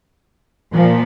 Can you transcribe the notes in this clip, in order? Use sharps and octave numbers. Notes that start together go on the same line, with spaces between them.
A#2 F3